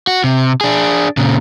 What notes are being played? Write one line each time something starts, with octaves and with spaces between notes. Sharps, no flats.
F#4
C3
D4 G#4
A#2 C#3